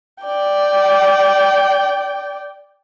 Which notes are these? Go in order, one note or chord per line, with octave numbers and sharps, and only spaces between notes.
D5 G5